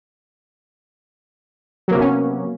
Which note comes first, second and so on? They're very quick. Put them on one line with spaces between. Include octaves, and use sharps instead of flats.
F#3 A#3 C3 B3 C#4